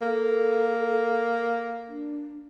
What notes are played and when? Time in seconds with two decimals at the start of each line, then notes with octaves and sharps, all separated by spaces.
0.02 A#3 A4
1.88 D4